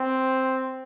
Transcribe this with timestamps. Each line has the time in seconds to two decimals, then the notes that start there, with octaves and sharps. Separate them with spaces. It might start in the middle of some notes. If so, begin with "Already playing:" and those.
Already playing: C4